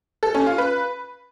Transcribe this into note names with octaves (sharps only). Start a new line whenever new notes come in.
A4
C#4
F4
B4